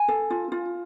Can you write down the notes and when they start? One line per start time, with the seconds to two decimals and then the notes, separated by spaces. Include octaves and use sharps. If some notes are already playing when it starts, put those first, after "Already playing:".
Already playing: G#5
0.08 A4
0.30 F4
0.52 F4